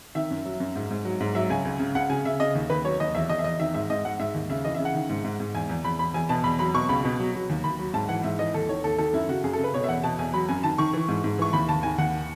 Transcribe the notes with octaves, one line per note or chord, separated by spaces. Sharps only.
D#3 E5
F#2
F#3
F#2
G#2
G#2
F#3
G#2
F#3 E5
C#2 G#5
C#2
C#3
C#2 F#5
C#3 G#5
C#3 E5
C#3 D#5
D#2
D#2 B4
F#3 C#5
D#2 D#5
E2 E5
E2 D#5
E5
E2 D#5
D#3 E5
G#2 E5
G#2 D#5
G#2 F#5
G#2 E5
D#2
C#3 E5
E3 D#5
E5
C#3
F#5
D#3
G#2
G#2
G#2
E2 G#5
E2
E2 B5
E2 B5
E2 G#5
B2 A5
E2 B5
F#3 B5
B2 C#6
C#2 B5
B2
F#3
F#3
D#2
D#2 B5
F#3
G#2 A5
E3 F#5
G#2 E5
E3 D#5
D#2 A4
D#3 C#5
D#2 A4
D#3 A4
F#2 E4
C#3 F#4
F#2 G#4
A4
C#3
B4
B2 C#5
E5
E2 F#5
B2 A5
E2 G#5
F#3 B5
F#2 G#5
D#3 A5
D#3 C#6
E3
G#2
G#2
E3 C#6
D#2 B5
D#2 A5
D#3 G#5
D#2 F#5